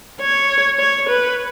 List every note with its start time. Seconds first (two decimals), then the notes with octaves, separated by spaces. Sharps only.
0.21 C#5
0.79 C#5
1.09 B4